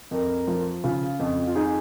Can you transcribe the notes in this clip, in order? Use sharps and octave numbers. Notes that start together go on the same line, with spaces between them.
F2 A#4
F3
C#3 F4
F2
F4
D#4 G#4